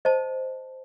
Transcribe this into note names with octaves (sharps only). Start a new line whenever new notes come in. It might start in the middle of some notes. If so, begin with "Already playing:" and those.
C5 D#5 A5